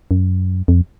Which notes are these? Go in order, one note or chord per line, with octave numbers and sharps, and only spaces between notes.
F#2
F2